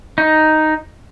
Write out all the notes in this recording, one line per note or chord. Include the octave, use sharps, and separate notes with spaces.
D#4